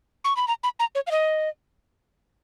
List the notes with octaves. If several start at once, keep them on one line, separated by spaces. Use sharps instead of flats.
C#6
B5
A#5
B5
A#5
C#5
F5
D#5